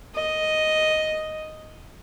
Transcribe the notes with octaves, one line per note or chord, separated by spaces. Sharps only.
D#5